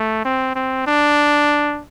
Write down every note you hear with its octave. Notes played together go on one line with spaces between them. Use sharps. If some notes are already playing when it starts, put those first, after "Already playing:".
Already playing: A3
C4
C4
D4